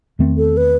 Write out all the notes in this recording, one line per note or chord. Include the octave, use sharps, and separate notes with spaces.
E2 D#3 A3 C4
A4
B4